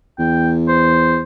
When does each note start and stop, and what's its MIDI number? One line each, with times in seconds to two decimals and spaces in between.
0.19 1.23 40
0.19 0.52 79
0.68 1.21 72